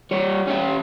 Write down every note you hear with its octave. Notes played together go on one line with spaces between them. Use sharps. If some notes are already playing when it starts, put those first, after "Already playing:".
G3 C#5
C#4 G4